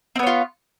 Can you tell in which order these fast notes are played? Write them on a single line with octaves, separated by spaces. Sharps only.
C4 B3 C#5 F4